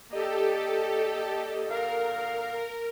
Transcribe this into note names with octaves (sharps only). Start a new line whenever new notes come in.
A#3 G4 A4 D5 D#5
A#2 D3 A#4 F5